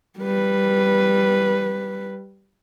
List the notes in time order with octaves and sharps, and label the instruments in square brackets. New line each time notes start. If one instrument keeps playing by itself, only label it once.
[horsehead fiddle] G3 B4